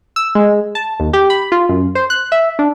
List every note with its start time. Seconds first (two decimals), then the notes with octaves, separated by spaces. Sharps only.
0.16 E6
0.35 G#3
0.75 A5
1.00 D#2
1.13 G4
1.30 B5
1.52 F4
1.69 F#2
1.95 C5
2.10 F#6
2.32 E5
2.59 D4